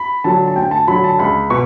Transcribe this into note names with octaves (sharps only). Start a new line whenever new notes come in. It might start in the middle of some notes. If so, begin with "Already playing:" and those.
Already playing: B5
D3 F#3 A5
A5
D2 G5
A5
D3 F#3 B5
A5
C#2 B5
B2 C#6